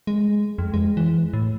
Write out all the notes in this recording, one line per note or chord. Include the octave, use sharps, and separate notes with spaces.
G#3
F2
G#3
E3
A2